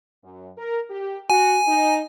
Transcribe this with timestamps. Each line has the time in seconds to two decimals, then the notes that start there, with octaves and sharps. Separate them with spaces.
0.24 F#2
0.57 A#4
0.90 G4
1.30 F#4 G#5
1.68 D#4